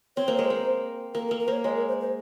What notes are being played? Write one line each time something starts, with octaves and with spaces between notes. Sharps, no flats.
C4 C#5
A#3 C5
G#3 A#4
C5
A#3
A#3 A#4
A#4
A#3
A#4
A#3 C5 C#5
G#3 C#5
A#4
C5
C5